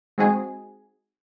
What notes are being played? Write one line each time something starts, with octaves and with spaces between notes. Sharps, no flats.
G#3 C4 D#4 F#4 G#4